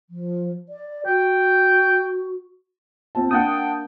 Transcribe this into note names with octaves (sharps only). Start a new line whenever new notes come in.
F3
D5
F#4 G5
C4 F4 A5
A#3 D4 F#5 G5 A5 D#6